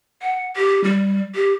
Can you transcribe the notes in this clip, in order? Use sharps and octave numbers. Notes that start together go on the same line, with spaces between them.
F#5
G4
G3
G4